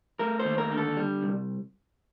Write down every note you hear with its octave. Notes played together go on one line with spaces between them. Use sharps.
A3 A#4
C5
D#2
A#4
D3
A4
G3
C2